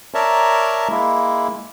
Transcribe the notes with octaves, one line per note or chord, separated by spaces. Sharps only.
A#4 C#5 D5 E5 A5 A#5
G#3 A#3 E4